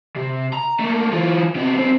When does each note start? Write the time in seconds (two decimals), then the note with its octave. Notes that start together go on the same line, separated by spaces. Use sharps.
0.16 C3
0.53 A#5
0.79 A3 A#3
1.13 E3 F4
1.56 C3 B3
1.75 B1 C4